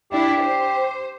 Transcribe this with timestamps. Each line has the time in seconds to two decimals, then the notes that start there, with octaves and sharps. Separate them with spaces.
0.12 D4 E4 G4
0.43 C5